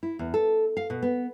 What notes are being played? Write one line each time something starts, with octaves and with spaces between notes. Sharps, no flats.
E4
E2
A4
F5
B2
B3